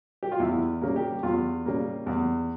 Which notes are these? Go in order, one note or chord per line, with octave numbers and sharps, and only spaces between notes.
G4
F4
E2 E4
C#3 G3 A#3
G4
E2 F4
C#3 G3 A#3
E2